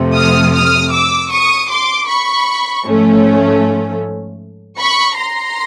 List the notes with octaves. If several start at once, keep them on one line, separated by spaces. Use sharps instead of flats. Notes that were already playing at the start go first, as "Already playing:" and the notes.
Already playing: F2 C3 F3 A3
D#6 F6
D#6 F6
D6 E6
C#6 D#6
C6 D6
B5 C#6
G#2 F3 A3 C#4
B5 C#6
A#5 C6